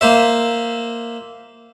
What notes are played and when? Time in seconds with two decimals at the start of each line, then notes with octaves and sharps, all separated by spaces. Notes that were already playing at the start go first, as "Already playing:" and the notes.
0.01 A#3 C5 E5